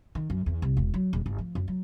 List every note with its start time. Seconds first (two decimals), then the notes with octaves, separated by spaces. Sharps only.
0.15 D#3
0.30 F#2
0.46 E2
0.62 C2
0.77 E1
0.94 F#3
1.13 D#1
1.26 G1
1.38 F3
1.55 F#2
1.68 F#3